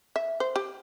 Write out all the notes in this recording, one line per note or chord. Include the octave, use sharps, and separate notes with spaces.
E5
C5
G4